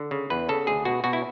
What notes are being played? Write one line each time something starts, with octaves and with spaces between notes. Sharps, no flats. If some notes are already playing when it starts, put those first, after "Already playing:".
Already playing: D3
C#3
E2 B4
C#3 A4
D2 G#4
B2 F#4
B2 F#4
E4